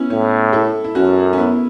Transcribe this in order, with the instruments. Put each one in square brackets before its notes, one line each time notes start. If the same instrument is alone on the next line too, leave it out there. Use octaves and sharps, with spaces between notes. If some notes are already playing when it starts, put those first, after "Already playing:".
Already playing: [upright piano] B3 C#4 E4
[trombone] A2 [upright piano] C#4
[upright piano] E4 A4
E4
[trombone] F#2 [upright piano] C#4 F#4
[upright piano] C#4
B3 E4